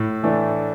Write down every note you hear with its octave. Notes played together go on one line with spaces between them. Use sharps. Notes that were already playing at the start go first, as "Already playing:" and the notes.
Already playing: A2
E3 A3 D4